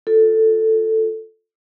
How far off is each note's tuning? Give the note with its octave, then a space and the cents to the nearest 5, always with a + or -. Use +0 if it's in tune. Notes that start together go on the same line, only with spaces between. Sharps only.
F4 +20 A4 +5